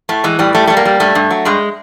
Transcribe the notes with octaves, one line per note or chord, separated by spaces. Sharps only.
A2 A3
E3 G#3
A2 G3
G3 A3
G3 A3
A#3
G3
G2 A3
G2
F#3
G2 G#3